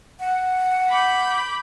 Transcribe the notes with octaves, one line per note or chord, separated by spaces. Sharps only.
F#5
B5 D6 G6